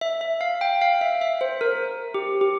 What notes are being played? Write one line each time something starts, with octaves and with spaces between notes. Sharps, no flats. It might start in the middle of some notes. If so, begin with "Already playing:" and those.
E5
E5
F5
G5
F5
E5
E5
C5
A#4
G4
G4